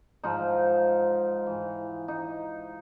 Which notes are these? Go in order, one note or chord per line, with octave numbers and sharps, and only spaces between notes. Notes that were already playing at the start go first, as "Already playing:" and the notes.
G#2 F3 D#4
G#2 E3
D#4